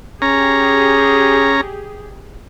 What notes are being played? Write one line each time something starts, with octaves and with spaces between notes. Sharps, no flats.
C#4 G4 G#4 A#5